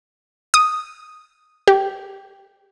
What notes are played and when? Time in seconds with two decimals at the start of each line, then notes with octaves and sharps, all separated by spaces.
0.54 D#6
1.68 G4